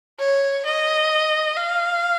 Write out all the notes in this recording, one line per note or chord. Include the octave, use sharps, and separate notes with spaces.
C#5
D#5
F5